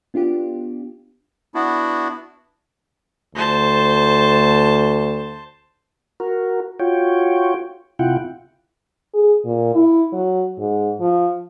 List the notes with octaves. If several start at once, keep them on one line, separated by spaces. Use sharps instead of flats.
B3 D4 F4 G4
B3 D4 E4 F#4
D2 C5 A5
F#4 A#4
F4 F#4 C#5 G5
C3 E4 F4 F#5 G5
G#4
A#2
E4
F#3
G#2
F3